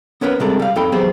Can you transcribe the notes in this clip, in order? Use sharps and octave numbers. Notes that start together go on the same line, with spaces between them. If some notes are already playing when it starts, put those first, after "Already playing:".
B3 C#4 A#4 B4 C#5
C3 G3 G#3 D4 A4 A#4
G3 F5
F2 D#4 A4 G5 B5
E2 F#3 B3 G4 G#4 C5